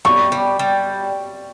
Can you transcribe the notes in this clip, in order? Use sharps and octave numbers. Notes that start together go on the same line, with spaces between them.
G3 C#6
G3
G3